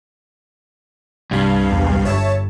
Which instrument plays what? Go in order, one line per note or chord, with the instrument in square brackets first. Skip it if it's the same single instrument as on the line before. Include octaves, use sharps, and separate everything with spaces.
[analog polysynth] C2 F5 [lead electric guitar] G2
[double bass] E2
[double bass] G1 [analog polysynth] C#5 E5 A5